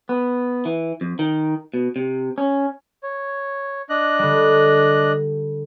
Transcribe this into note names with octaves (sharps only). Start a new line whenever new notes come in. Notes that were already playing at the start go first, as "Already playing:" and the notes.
B3
E3
F2
D#3
B2
C3
C#4
C#5
D4 D#5 F#6
D3 G3